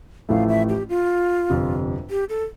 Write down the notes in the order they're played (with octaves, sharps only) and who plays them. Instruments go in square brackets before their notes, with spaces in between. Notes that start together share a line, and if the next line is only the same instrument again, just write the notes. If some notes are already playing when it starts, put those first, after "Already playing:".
[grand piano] A1 A2 F3 A3 E4 [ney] F5
[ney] E5
G4
F4
[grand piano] G1 F2 C3
[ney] G4
A4